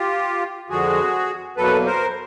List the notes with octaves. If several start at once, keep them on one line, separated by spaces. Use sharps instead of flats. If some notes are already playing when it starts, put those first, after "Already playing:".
Already playing: F4 G4
F2 D3 F3 G#3 F#4 G#4
E2 B2 F#3 A#3 A4 B4
A#4 C5